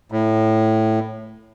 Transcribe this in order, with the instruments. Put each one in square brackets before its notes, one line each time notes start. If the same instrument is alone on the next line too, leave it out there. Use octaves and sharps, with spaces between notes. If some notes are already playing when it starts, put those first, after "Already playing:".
[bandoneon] A2